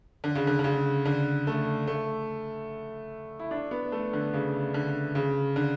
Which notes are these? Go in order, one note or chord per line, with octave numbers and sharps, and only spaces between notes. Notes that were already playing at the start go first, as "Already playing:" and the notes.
D3
C#3
D3
D3
C#3
D3
A3
A3
E4
D4
B3
A3
D3
C#3
D3
C#3
D3